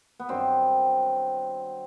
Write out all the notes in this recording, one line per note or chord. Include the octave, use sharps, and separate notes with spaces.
B3
G2 D#3 F#3 C4